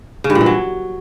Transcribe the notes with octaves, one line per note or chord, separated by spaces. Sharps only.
C#3
G2
A#2
E3
F#3